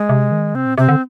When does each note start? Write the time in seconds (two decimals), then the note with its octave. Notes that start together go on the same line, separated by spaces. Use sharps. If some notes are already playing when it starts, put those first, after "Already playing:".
Already playing: G#3
0.09 C3
0.32 D#3
0.54 C3 C4
0.66 A#2
0.78 C3 C4
0.89 D3